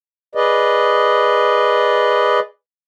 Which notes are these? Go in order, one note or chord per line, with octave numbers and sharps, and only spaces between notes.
G#4 B4 D5 D#5